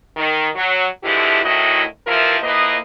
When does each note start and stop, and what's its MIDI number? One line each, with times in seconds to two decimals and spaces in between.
0.17 0.48 51
0.55 0.87 54
1.04 1.41 50
1.04 1.41 52
1.04 1.41 53
1.04 1.41 56
1.04 1.41 64
1.04 1.41 67
1.44 1.82 38
1.44 1.82 45
1.44 1.82 51
1.44 1.82 64
1.44 1.82 66
1.44 1.82 75
2.06 2.37 48
2.06 2.37 52
2.06 2.37 53
2.06 2.37 64
2.06 2.37 65
2.06 2.37 70
2.43 2.77 41
2.43 2.77 58
2.43 2.77 64
2.43 2.77 71
2.43 2.77 75